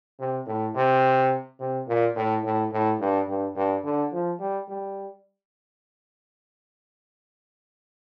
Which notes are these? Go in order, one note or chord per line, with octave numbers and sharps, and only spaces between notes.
C3
A2
C3
C3
A#2
A2
A2
A2
G2
G2
G2
D3
F3
G3
G3